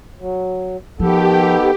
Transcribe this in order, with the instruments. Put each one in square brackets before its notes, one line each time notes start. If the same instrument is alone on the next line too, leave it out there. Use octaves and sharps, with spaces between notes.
[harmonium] F#3
[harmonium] D#3 B3 A4 [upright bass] F3 [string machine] G4